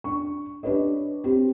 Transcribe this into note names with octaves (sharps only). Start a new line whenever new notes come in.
D4 C#6
D4 G4 B4 C#5 D#5
C4 G4